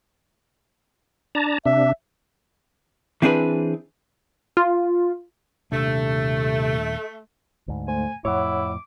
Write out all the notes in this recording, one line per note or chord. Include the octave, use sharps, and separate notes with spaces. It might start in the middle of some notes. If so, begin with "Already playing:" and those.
D4 A5 A#5
C3 D4 E5
E3 C4 D4 G#4 B4
F4
D#1 C3 A3 D4
D2 G#2
A3 C5 G#5
F2 A2 E4 C#5 F#5 D6